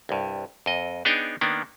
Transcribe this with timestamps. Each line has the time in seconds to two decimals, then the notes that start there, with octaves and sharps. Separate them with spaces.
0.09 C2 G2
0.66 F2 D#5
1.05 B3 D4 D#4 G#4 C#5 G5
1.41 D#3 A#3 B3 D4